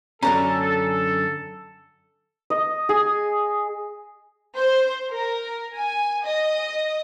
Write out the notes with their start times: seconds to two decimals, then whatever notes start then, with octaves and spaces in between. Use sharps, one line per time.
0.23 F#2 D3 C#4 A4 A#5
2.50 D#5
2.89 G#4
4.57 C5
5.10 A#4
5.75 G#5
6.23 D#5